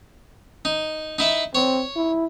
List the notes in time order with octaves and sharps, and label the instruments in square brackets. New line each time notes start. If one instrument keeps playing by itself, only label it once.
[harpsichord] D#4
D#4 E4 E5
[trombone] C4 [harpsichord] C#5
[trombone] E4